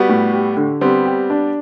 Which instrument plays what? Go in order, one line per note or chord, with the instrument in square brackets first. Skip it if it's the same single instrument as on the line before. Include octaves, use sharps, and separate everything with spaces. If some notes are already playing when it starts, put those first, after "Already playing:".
Already playing: [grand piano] G3 B3 [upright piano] F#4
[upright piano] A2
G4
D3
[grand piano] G3 B3 [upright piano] C4
[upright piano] G4
D4